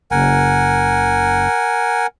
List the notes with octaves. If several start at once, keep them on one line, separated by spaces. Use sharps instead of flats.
F#1 A#4 F#5 G#5